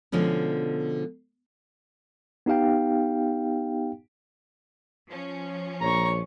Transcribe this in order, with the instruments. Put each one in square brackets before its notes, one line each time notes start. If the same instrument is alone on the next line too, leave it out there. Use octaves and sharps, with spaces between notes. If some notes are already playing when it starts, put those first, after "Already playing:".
[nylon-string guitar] B2 D3 F3 G#3 C#4
[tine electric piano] B3 D#4 G4 F5 G5
[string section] F3 C#4
[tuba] A#1 [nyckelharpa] C#5 C#6 [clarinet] A#5